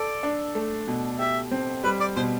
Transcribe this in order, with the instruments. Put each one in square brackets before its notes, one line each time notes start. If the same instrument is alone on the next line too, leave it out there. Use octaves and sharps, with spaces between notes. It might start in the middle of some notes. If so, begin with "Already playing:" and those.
Already playing: [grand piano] A4 [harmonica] D5
[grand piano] D4
A3
B2
[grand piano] G4 [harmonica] E5
[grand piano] C4
[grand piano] G3 [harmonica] B4
[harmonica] D5
[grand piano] B2 [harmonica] C5